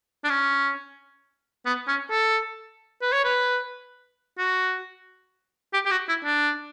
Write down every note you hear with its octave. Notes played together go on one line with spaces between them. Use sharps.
D4
C#4
B3
C#4
A4
B4
C#5
B4
F#4
G4
G4
F#4
E4
D4